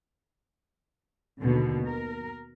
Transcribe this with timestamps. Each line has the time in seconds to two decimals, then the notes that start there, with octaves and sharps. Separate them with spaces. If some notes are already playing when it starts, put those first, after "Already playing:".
1.39 D#2 B2 D3
1.85 A#4